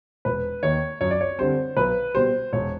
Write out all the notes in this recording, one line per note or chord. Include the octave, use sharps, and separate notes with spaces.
E1 B4
D#2 D#3 C#5
F#2 C#5
D5
C#5
D3 G3 C4 C5
B1 B4
B2 G3 C5
E1 C#5